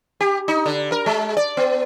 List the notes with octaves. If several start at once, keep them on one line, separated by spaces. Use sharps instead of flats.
G4
D#4
D3
A#4
G#3
D5
B3